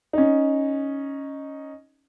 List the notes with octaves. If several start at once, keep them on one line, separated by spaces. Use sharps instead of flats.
C#4 D#4